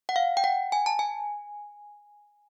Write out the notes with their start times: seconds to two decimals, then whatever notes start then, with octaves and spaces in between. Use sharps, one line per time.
0.09 F#5
0.16 F5
0.37 G5
0.44 F#5
0.72 G#5
0.86 A5
0.99 G#5